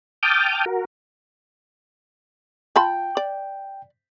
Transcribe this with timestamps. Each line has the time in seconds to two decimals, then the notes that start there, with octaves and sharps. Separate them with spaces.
0.23 G5 A5 D6 D#6 F6 G6
0.66 F#4 A#4
2.76 F4 G5 A5 B5
3.17 D5